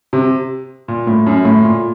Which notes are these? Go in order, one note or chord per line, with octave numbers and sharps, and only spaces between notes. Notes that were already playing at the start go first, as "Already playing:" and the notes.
C3
A#2
A2
F#2
A2
A#2